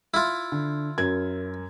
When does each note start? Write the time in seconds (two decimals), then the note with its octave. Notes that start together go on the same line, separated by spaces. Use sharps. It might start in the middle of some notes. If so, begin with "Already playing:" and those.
0.14 E4 F4
0.52 D3
0.98 F#2 A#4 G#6